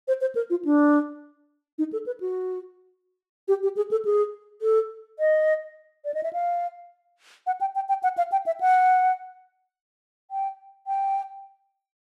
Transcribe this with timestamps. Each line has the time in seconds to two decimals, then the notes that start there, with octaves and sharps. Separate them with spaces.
0.08 C5
0.21 C5
0.35 A#4
0.50 F4
0.65 D4
1.78 D#4
1.93 A4
2.06 B4
2.20 F#4
3.48 G4
3.63 G4
3.77 G#4
3.91 A4
4.05 G#4
4.62 A4
5.19 D#5
6.05 D5
6.14 D#5
6.23 E5
6.33 F5
7.47 F#5
7.61 G5
7.75 G5
7.89 G5
8.03 F#5
8.18 F5
8.32 G5
8.46 E5
8.61 F#5
10.31 G5
10.87 G5